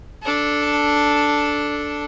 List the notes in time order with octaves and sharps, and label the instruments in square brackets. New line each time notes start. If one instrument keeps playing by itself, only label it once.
[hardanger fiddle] D4 A4